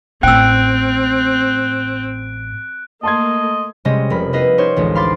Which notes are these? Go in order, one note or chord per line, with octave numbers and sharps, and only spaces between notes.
A1 A2 C4 G5 E6 F#6 D7
A3 A#3 D#5 A5 C6 G#6
C3 G3 G#3 C#4 D#5
F1 A#4 B5
B3 E4 B4 D#5 F5
D#4 G4 C5 C#5
A1 D2 G#3
F5 B5 C6 D6 A6